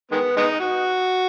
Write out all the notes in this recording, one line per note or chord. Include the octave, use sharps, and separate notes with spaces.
D#3 G#3 B3
G#3 B3 D#4
F#4